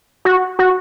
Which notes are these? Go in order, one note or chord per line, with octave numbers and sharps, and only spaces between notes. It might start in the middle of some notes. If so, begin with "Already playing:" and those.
F#4
F#4